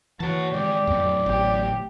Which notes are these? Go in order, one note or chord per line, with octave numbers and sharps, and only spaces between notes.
E3 F#4 C#5 A5
D#3 G#3 G4 D5
F2 A2 F#3
A1 G4